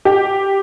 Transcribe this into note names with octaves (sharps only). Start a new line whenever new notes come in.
G4